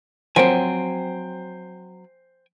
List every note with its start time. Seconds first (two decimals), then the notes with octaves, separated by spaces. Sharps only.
0.36 F3 F#3 A#3 C4 C5 G5 G#5